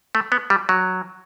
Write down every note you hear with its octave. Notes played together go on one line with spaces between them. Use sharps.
A3
B3
G3
F#3